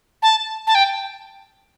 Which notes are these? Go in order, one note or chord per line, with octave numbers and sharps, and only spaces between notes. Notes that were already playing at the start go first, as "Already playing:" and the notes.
A5
A5
G5